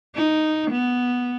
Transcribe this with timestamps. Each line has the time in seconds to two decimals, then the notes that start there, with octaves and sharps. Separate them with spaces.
0.15 D#4
0.71 B3